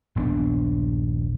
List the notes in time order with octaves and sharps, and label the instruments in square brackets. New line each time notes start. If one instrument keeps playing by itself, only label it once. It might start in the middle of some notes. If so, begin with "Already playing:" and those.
[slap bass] D#1 A#1 B3 D4